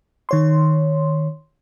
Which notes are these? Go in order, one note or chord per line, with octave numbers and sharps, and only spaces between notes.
D#3 C#5 C6